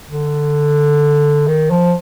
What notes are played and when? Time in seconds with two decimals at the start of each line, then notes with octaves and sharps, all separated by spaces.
0.10 D3
1.48 D#3
1.70 F3